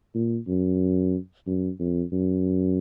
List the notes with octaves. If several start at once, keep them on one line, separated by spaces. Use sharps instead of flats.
A#2
F#2
F#2
F2
F#2